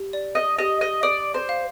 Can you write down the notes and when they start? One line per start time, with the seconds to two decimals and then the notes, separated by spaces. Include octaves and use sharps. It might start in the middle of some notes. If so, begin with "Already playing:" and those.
Already playing: G4
0.13 D5
0.35 D#5
0.58 G4 D#5
0.81 D#5
1.03 D5 D#6
1.34 C5
1.49 F5